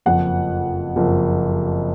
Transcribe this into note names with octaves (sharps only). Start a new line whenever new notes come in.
F#1 F2 F3 F#5
F#1 F2 F3